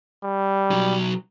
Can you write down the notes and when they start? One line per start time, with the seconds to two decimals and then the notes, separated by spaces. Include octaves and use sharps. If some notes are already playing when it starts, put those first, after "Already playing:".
0.24 G3
0.71 B1 F#3